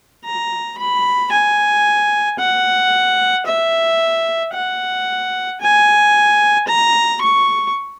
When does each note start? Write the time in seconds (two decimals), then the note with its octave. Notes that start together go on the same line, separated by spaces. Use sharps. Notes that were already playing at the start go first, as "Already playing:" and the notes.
0.25 A#5
0.78 B5
1.32 G#5
2.39 F#5
3.46 E5
4.53 F#5
5.61 G#5
6.68 A#5
7.21 C#6